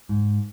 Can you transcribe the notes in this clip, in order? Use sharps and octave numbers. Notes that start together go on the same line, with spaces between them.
G#2